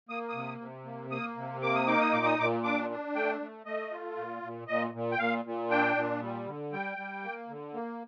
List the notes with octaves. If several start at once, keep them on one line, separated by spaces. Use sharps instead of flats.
A#3 D#6
D#6
C3
C3
A#3
A#3 D#6
C3
A#3 D6
D#6
D#4 D6
D#6
A#2 D6
D#6
A#2 D6
D4 D6
D4
A3 G5
A3
A3 D#5
F4
A#2
A#2
A#2 D#5
A#2
G5
A#2 F5
A#2
D4 G5
A#2
G3
D3
G3 G5
G3
A#3
D3
A#3